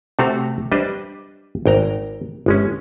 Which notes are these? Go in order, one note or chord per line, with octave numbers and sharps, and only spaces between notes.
C3 A3 C4 F#4 A#5
G3 D4 B4 C5 D#5
G#1 G5 A#5
G1 G#3 C#4